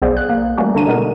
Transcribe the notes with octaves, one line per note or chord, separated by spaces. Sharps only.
B1 B3 G#4 C5 D5 F5
F#6
A#3
E3 G3 A3 A#3 C#4 F#4
D3 A#3 D4 A#5 D#7
B2 G3 G#3 B3 D#4 A#4